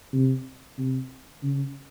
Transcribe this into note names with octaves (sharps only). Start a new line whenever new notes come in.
C3
C3
C#3